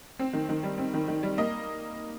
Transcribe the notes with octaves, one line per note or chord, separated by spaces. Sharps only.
C4
D#3
D#3
G3
C4
D#3
D#3
G3
A#3 D#5